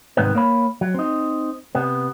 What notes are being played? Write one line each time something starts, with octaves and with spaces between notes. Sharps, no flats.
C2 G#2 D#3 B3 C4 B4
A#3 C#5 B5
F#3
C4 D#4
C3 B3